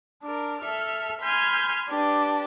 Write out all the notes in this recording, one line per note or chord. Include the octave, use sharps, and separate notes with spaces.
D4 A#4
A4 E5 F6
G#5 B5 C6 F6 G6
D4 G4 B4